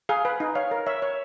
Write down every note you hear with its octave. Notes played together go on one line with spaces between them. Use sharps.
G#4 F5
B4
D#4
C#5 F5
A#4
C#5 E5
C#5